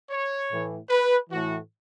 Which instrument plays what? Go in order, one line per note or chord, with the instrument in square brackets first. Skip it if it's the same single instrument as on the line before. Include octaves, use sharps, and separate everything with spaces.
[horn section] C#5
A2 E3
B4
A2 E3 F#4